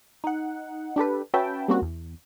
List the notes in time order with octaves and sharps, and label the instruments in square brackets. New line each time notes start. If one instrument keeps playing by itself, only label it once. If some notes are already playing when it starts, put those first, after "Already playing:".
[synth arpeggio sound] D#4 F#5
D4 G4 A4 B4
C#4 F#4 B4 E5 G5 A5
G3 A#3 C4 C#4 F#4
E2